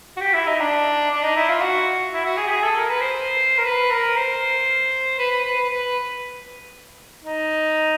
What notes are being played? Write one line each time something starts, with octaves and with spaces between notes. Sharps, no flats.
F#4
G4
E4
D#4
D4
D4
D#4
E4
F4
F#4
E4
F#4
G#4
G4
G#4
A4
A#4
B4
C5
A#4
B4
A#4
C5
B4
B4
B4
B4
B4
D#4